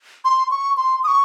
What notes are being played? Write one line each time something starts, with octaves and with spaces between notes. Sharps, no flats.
C6
C#6
C6
D#6
C#6